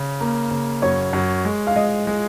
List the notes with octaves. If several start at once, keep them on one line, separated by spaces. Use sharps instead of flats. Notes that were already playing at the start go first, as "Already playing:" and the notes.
Already playing: C#3
A#3
C#3
F#2 C#5
F#2
G#3
F5
G#3 D#5
G#3